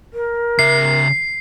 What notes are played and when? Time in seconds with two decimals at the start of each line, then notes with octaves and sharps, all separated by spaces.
0.13 A#4
0.59 C#3 E5 C7